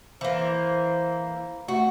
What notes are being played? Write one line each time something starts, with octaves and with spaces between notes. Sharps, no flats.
E3 A#3 C5
A3 F#4